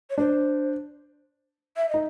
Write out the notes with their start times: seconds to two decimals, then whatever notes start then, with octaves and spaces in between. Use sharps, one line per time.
0.10 C#5
0.18 D4 C5
1.76 E5
1.89 D#4 D#5